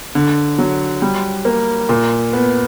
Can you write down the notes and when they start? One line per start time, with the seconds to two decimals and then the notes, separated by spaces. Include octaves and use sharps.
0.15 D3
0.58 F#3
1.02 G3
1.45 A#3
1.89 A#2
2.33 B3